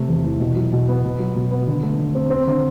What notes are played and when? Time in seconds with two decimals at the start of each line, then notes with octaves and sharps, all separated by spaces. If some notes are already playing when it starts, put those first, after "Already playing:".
Already playing: C3 A3
0.09 E2
0.24 E3
0.40 B2
0.56 F#3
0.72 B2
0.88 B3
1.04 B2
1.19 F#3
1.35 B2
1.51 B3
1.67 D3
1.83 A3
1.99 D3
2.15 C4
2.30 C4
2.47 D3